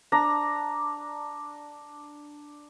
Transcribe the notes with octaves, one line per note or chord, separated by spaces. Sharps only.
D4 A#5